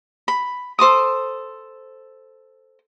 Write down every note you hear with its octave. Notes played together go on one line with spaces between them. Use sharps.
B5
A4 C5 D6 D#6